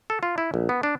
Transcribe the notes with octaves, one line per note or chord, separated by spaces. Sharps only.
A4
F4
E4
A#1
B3
D4